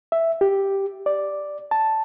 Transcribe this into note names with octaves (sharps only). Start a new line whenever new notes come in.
E5
G4
D5
A5